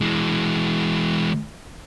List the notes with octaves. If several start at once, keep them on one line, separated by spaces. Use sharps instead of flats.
E3 G#3